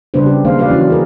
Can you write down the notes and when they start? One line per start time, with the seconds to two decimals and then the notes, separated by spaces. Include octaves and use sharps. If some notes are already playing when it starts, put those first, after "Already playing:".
0.14 C#3 G3 B3 D4 B4 C5
0.26 G4
0.44 D#3 G#3 A#3 C5 F5
0.58 F#3 B4 D5 F5
0.70 E3 F#3 C#4 E4
0.90 G#4 A#4